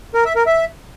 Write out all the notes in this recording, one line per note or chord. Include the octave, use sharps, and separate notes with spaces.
A#4
E5
A#4
E5